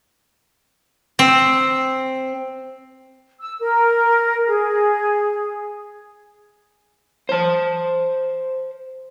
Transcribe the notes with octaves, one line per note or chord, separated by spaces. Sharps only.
C4
E6
A#4
G#4
C5 A5